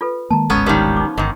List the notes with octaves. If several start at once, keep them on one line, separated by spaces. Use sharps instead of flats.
F4 A4 B4
D#3 G#3 A#3 A5 A#5
D1 G#1 F#3 G#3 B3 C#4 A4
D#3 F3 G3 A#4
D#4 D6
G1 G#2 D#3